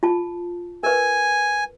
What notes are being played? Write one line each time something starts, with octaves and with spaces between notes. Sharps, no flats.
F4 A5
A#4 B4 G#5